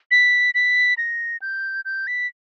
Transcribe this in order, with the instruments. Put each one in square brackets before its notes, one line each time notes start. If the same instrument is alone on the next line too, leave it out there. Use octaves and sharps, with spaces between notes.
[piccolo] B6
B6
A#6
G6
G6
B6